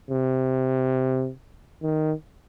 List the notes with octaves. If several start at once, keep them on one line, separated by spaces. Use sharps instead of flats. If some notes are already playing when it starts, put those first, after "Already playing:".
C3
D#3